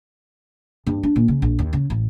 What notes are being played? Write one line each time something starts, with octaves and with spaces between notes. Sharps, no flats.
G2
D4
A#2
C#3
A#1
D#2
C#3
A1